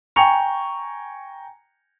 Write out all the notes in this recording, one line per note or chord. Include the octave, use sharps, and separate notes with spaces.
G5 G#5 A#5 C#6 C#7 F7